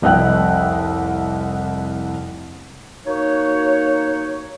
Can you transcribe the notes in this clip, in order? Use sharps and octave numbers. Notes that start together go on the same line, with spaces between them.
F1 C2 D#5 F#5 G5 F#6
A#3 D#4 F#4 C#5